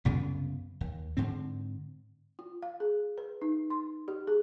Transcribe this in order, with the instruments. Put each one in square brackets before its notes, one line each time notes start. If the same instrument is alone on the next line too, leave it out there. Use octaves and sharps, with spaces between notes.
[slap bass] C2 F#2 C#3 B3
D#2
G#2 D3 C4
[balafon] F4
F5
G#4
B4
D#4
C6
G4
G#4